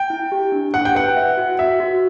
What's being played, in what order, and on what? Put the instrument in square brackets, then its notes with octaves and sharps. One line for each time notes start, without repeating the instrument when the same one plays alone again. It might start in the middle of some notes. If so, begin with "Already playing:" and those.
Already playing: [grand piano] G5
[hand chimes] E4
G4
D4
[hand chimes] E4 [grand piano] F#5
[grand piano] G5
[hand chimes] B4 [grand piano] F#5
[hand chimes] E5
F#4
[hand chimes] F#4 [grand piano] E5
[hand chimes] F#4